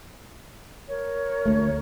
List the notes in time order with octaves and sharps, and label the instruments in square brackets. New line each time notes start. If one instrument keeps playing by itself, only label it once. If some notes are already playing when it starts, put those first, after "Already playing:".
[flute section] A#4 C#5
[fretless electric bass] D2 A3